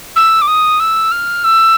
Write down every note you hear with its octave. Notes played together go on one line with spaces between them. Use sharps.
E6
D6
D#6
E6
F6
E6